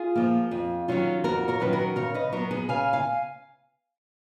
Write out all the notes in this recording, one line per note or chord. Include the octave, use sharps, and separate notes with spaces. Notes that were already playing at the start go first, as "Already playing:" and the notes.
Already playing: F4 G#4
F3 A#3
F2
D#3 F#3 C#4 F4
F2 F#4 A#4
A#4 C#5
D#3 F#3 C#4 F4 B4
F#4 A#4
C#3 A#4 C#5
B4 D#5
F#3 B3 A#4 C#5
G#4 B4
C#3 F5 G#5
F5 G#5